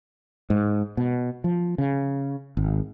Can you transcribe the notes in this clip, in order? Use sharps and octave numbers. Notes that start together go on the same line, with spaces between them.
G#2
B2
F3
C#3
G#1